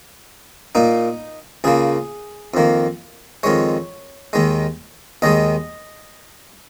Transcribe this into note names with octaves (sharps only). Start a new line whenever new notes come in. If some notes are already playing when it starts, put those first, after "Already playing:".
A#2 A#3 D#4
C#2 C#3 A#3 G#4
F2 D#3 A#3
F2 D#3 G#3 C#5
D#2 D#3 G#3
D#2 D#3 G#3 D#5